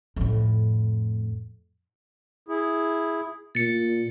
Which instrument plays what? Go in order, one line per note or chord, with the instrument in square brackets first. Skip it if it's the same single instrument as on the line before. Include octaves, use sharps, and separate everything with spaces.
[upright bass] F2 A2
[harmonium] E4 G#4
[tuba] A#2 [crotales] A6 C#7